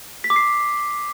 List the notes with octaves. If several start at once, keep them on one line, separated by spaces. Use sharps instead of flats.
B6
D6
C7